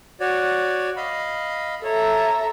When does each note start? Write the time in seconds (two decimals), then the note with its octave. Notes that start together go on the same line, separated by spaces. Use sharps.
0.20 F#4 C#5 D5
0.97 D#5 F5 B5
1.84 A4 C#5 E5 A#5